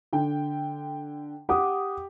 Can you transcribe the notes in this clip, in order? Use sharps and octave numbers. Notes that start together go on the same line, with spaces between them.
D3 G5
G4 F#5 D6 D#6